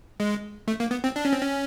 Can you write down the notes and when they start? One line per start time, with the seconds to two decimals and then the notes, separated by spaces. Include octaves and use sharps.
0.20 G#3
0.68 A3
0.80 A#3
0.91 B3
1.04 C4
1.16 D4
1.25 C#4
1.33 C4
1.42 C#4